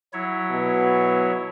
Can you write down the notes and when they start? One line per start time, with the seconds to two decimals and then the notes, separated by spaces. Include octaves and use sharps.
0.13 F#3 E4 C#5
0.50 B2